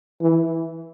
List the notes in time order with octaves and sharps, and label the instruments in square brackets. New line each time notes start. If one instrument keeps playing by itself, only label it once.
[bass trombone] E3